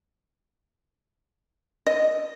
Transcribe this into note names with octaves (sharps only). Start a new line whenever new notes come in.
D#5